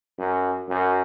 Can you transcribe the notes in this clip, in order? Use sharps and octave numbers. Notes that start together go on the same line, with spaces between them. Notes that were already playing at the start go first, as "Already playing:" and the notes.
F#2
F#2